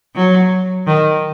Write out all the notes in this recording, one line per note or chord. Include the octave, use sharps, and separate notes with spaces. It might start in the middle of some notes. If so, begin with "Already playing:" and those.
F#3
D#3